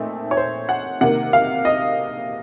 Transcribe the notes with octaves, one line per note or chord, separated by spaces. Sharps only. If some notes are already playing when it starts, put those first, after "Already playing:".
Already playing: A#2 A3 C4 D#4
C#5
C5
F#5
C3 D#3 A#3 F#5
F5
D#5